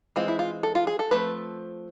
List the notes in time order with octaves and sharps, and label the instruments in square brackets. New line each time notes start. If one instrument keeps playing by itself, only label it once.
[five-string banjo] E3 G#3 C4 F4
E4
F4
A4
F4
G#4
A4
F3 A3 C4 B4